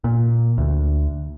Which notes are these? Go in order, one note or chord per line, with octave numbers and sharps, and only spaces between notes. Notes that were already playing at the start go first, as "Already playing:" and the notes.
A#2
D2